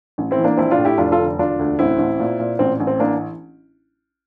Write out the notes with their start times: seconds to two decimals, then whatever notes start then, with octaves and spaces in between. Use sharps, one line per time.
0.18 A1
0.31 C4 E4
0.38 E3
0.44 A#3 D4
0.57 A#1 C4 E4
0.71 D4 F4
0.78 A2
0.85 E4 G4
0.98 F1 D4 F4
1.11 F4 A4
1.19 D3
1.38 E1 D4 F4
1.59 D2
1.79 A1 C4 E4
1.99 A1
2.20 A#2
2.40 A#2
2.59 A1 C4
2.80 A1
2.87 C4
2.99 E3 A#3 D4